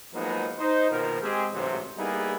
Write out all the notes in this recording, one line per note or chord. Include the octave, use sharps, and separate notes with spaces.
F3 F#3 G#3 A#3 B3 D#4
D#4 C5
A#1 B2 D#3 F3 A#4
G#3 C4 G4 G#4
A1 G#2 C3 F#3 C5
G3 A#3 B3 D#4 E4 G#4